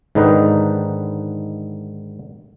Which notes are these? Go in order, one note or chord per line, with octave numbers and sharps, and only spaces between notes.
G#2 D3 D#3 D#4 B4